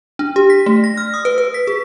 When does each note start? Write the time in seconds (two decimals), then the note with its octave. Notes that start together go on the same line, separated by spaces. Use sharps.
0.19 D4
0.36 G4
0.50 B6
0.66 A3
0.84 A#6
0.97 F6
1.14 D#6
1.25 B4
1.38 B4
1.54 B6
1.67 G#4